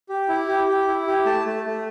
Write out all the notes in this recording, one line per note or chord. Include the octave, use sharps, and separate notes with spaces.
G4
E4
G4
G4
E4
G4
A3 A5
A3
A3